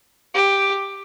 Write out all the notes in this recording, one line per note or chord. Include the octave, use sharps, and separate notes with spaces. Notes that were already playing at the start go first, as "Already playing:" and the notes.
G4